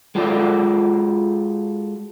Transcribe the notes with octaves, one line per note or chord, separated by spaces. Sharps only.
G#3 F4 F#4 A4 D5